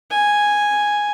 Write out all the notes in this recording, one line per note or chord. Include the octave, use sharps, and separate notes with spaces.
G#5